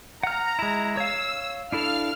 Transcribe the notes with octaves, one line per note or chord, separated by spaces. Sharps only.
F#5 A#5 F6
G#3 E4
C#5 F5 E6
D4 E4 A4 F5 F6